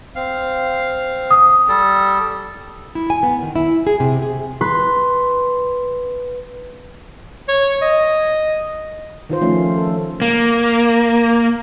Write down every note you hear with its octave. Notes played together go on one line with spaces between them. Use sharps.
C4 F5
D#6
G3 A4
E4
G#5
B3
D#3
E4
G#4
C3
G#4
B4 C6
C#5
D#5
D#3 F4 C5
F3 A3 C#4
A4
A#3